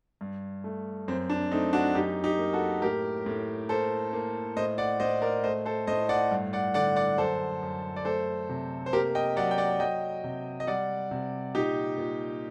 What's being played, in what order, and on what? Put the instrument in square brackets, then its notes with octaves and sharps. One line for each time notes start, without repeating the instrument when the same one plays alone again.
[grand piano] G2
A3
F#2 C4
D4
A3 C4 D#4
D4 F#4
F#2 D#4 G4
D#4 G4
A#3
F#4 A4
A2 G4 A#4
A2
A#3 A4 C5
A#3
A2 C5 D#5
D5 F#5
A2 C5 D#5
A#4 D5
A3 C5 D#5
A4 C5
A2 C5 D#5
D5 F#5
G2
D5 F#5
D3 D5 F#5
D5 F#5
F#2 A4 C5
F#2
D5
A3 A4 C5
C3
C5
A#3 G4 A#4
D#5 G5
F#3 D5 F#5
G5
D5 F#5
F#3 D#5 G5
C3
D#5
G3 D5 F#5
C3
A#2 D#4 G4
A#2